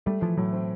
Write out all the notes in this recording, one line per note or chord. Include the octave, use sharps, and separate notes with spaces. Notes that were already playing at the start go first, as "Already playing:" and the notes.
G3 A3
E3 F3
A2 F#3
C4